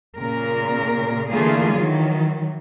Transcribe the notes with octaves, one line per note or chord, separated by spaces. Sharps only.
A#2 C#3 A#4
D3 E3 A3 A#3 F4 G#4
D#3 E3 F#3